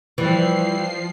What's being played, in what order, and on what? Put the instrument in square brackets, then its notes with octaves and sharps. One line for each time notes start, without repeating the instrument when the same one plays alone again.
[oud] E3 G3 [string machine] F3 C7